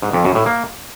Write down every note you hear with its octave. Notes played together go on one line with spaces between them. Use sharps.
G#2
F2
F#2
A2
A#3